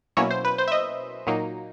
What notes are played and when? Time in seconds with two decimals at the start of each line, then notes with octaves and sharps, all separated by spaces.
0.17 B2 F#3 A#3 C#4 E4 C#5
0.30 C5
0.45 B4
0.58 C5
0.68 E5
0.72 D#5
1.27 A#2 F#3 A#3 D#4